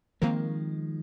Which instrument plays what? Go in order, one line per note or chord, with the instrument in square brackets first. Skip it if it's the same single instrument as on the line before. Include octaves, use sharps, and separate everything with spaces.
[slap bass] D#3 F3 G#3 [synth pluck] A#3 C4 A#4